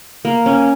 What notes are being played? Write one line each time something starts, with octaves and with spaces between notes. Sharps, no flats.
A#3
C#4